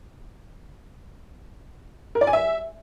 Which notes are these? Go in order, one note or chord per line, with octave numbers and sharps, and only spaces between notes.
A#4
D5
G#5
E5